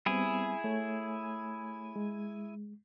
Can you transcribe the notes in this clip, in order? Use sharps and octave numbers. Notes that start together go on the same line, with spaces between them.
G3 B3 C4 E4 G#4 G#5
A3 C#5
G#3